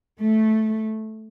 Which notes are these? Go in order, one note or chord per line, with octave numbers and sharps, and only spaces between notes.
A3